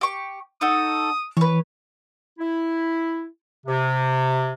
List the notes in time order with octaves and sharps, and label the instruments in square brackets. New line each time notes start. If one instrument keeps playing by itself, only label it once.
[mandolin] G4 C#6
[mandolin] D#4 F#4 A4 [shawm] D#6
[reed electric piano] E3 [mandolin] B4 C#5
[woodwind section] E4
C3